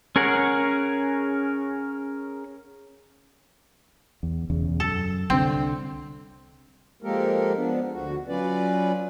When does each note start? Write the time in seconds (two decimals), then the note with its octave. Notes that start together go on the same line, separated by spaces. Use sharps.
0.16 C#4 G#4 A#4 C#5 F#5
4.23 E2
4.50 E1 E2 C#3
4.80 F#2 A4
5.30 C2 D3 C4
7.03 F3 G#3 A#3 G4 A4 A#4
7.56 F3 B3 D4
7.92 D2 F#4
8.28 F#3 C#4 F4 B4 D5